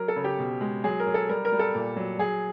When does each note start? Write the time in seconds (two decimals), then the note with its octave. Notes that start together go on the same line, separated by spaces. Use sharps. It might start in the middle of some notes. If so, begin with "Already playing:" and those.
Already playing: F#3 A#4
0.08 A4
0.16 C#3
0.24 G4
0.39 B2
0.61 G#3
0.84 F#3 G#4
1.00 A#4
1.07 F#3
1.14 A4
1.29 G3 A#4
1.45 A#4
1.52 G3
1.59 A4
1.75 A#2
1.96 F#3
2.19 F#3 G#4